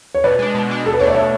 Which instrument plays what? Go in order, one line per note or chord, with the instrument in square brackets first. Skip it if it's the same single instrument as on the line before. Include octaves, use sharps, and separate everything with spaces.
[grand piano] C#5
[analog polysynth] B2 [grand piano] B4 D5
[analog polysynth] G#3 D4
B2
G#3 D4
[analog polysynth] B2 [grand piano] A4
[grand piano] B4
[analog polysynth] D4 [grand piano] C#5
[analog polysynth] A3 [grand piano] D5
[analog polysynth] B2 [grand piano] C#5 E5